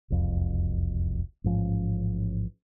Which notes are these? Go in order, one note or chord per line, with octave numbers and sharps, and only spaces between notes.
E1 C2 F2
A1 G#2 F3 C#4